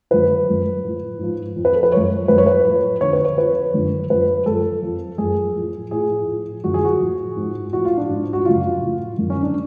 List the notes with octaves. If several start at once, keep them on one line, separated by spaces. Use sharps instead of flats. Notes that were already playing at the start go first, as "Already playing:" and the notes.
F#2 D3 F3 B4
F#2 F3
A2 F3
G#2 F3
F2 F3
B4
A4
B4
F#2 F3 C#5
F#2 F3 B4
C#5
B4
A2 F3
F2 D3 F3 C#5
B4
C#5
F2 F3 B4
F#2 D3 F3
F#2 F3 B4
F#2 F3 A4
F2 F3
F#2 F3 G#4
A2 F3
A2 F3 G#4
A2 F3
F#2 D3 F3 F#4
G#4
F#4
A2 F3
G#2 F3
A2 F3 F#4
F4
D4
G#2 F3
F#4
F#2 C#3 F3 F4
A2 F3
F#2 D3 F3
C#4
D4